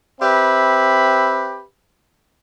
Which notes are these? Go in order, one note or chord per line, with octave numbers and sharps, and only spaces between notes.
C4 G4 B4 E5 B5